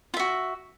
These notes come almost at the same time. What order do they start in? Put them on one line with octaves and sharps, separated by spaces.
F4 E5 F#4